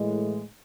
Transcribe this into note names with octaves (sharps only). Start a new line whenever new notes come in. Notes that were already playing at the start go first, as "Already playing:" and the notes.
Already playing: A2 E3 G#3